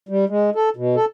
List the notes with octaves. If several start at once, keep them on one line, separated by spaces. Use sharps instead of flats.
G3
G#3
A4
B2
A4